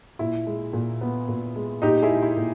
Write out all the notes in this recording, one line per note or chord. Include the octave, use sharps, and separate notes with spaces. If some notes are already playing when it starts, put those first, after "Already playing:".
A#2 E4
G#3
A#2
B3
A#2
G#3
A#2 D#4 G4
E4 G#4
G#3
E4
A#2